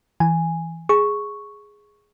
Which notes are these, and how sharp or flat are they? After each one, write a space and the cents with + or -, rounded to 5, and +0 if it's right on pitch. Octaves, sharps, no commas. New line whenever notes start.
E3 +0 G#5 -5
G#4 +0 C#6 +0